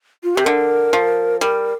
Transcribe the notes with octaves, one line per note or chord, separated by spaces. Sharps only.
F4
C3 G4
D3 A#4
F3
G3 A#4